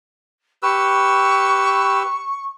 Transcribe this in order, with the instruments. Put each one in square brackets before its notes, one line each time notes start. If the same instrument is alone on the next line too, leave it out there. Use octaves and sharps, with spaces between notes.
[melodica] G4 B4 E6 [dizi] C#6